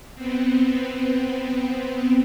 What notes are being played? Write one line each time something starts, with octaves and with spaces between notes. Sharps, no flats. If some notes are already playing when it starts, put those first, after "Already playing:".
B3 C4